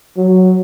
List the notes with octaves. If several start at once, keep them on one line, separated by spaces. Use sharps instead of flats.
F#3